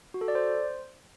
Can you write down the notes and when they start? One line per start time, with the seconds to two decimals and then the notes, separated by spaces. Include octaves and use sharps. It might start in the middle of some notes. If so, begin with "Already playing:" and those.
0.14 F#4
0.21 A4
0.28 D5
0.35 C5